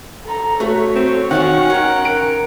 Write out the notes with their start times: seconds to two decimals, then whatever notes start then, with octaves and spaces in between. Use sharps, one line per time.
0.24 A4 A#5
0.60 A3 F#4 C#5 E5
0.95 C4
1.31 D#3 F#4 F5 F#5 G#5
1.70 C#4 A#4 G5
2.05 D7